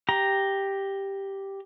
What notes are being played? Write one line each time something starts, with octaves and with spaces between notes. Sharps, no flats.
G4 A#5